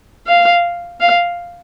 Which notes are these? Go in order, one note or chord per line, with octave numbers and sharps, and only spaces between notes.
F5
F5